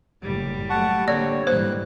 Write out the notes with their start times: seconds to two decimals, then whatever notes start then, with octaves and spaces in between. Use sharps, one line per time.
0.22 F#1 A2 G3
0.70 F#3 A3 F#5 A5 C#6
1.08 D3 A#3 C4 C#5 D5
1.47 G#2 E3 G3 C5 F#6